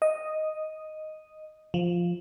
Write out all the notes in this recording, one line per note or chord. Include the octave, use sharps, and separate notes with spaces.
D#5
F3